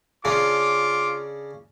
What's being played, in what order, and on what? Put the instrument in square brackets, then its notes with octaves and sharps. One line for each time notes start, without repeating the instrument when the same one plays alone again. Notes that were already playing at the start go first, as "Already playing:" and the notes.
[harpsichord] C#3 C#4 D4 [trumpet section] F4 D6